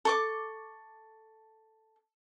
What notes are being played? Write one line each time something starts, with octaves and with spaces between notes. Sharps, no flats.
A4 C#6 D6